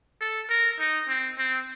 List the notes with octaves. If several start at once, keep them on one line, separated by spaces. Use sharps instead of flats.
A4
A#4
D#4
C4
C4